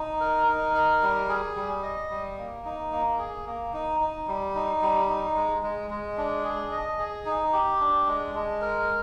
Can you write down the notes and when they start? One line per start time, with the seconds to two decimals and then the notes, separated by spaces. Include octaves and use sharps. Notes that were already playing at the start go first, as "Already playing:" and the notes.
Already playing: D#4
0.21 A#4
0.47 D#4
0.74 A#4
1.02 G3
1.29 G#4
1.56 G3
1.83 D#5
2.10 G3
2.38 A#3
2.65 D#4
2.92 A#3
3.19 G#4
3.46 A#3
3.73 D#4
4.00 D#4
4.27 G3
4.55 D#4
4.81 G3
5.09 D#4
5.36 G#3
5.63 G#3
5.90 G#3
6.17 D4
6.44 G#4
6.71 D#5
6.99 G#4
7.25 D#4
7.53 G4
7.80 D4
8.07 G#3
8.35 G#3
8.61 A#4